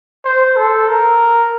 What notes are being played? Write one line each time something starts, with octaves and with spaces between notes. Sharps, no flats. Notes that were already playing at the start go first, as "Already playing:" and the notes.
C5
A4
A#4